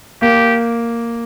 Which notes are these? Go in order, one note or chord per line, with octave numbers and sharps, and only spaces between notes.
A#3 G4